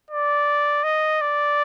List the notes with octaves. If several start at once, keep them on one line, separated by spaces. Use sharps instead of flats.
D5
D#5
D5